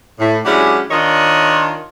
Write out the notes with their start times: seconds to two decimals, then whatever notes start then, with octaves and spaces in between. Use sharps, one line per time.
0.19 A2
0.45 F#3 G#3 C#4 D4 E4 G4
0.91 D#3 D4 F4 C#5 D#5